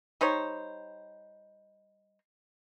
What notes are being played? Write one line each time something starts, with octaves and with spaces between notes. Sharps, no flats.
G3 D#4 C5 C#5